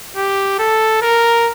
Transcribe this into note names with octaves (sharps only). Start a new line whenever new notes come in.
G4
A4
A#4